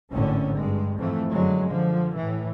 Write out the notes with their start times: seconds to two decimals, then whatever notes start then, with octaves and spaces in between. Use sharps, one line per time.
0.11 G#1 A2 D3 C#4
0.56 G2 G#3
0.98 F2 G#2 E3 A3
1.31 F#2 D3 F#3 G#3
1.67 D3 F3
2.15 A2 E3